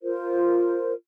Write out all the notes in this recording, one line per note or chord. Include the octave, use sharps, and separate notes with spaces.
F4 A#4 C5